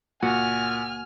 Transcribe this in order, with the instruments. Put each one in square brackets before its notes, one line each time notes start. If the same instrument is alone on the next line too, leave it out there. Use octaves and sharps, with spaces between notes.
[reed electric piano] C#2 A#3 [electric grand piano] A#2 [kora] F#4 [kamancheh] G#5 F6